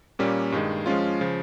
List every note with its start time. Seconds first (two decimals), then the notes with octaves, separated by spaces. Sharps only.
0.19 A#2 G3 A#3 C#4
0.52 G2 D#3 G#3
0.86 F3 G#3 C#4 F4
1.21 C#3 F3